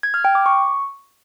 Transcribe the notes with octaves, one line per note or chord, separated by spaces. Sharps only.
G#6
F6
G5
D6
C#6